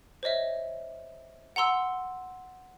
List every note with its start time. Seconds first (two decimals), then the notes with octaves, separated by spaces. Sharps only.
0.23 C5 C#5 D#5 E5
1.56 F#5 A#5 C6 E6